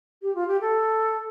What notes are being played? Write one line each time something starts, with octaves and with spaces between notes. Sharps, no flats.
G4
F4
G4
A4